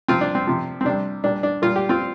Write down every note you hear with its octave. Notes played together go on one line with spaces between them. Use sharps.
C3 F3 C4 F4
D4
C4
C3 F3
C4
C3 G3 D4
A#2 G3 D4
D4
A#2 G3 F4
G4
C4 F4